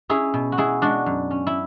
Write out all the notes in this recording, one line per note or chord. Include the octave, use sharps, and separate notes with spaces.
C#4 E4 G#4
B2
F#4
B2 E4 G#4
G#3 D4 F#4
F#2
C#4
E4